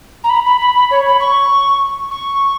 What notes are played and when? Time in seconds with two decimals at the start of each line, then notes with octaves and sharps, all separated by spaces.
0.24 A#5
0.29 B5
0.46 B5
0.61 B5
0.75 B5
0.91 C#5
1.06 B5
1.20 C#6
2.11 C#6